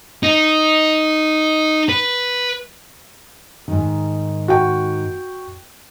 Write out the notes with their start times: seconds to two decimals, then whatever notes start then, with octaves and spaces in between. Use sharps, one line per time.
0.23 D#4
1.89 B4
3.68 G#2 D#3
4.48 F#4 G5